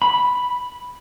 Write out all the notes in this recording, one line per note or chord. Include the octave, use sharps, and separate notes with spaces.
B5